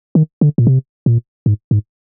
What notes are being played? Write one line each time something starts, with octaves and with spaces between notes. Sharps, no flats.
D#3
D3
A#2
C3
A#2
G#2
G#2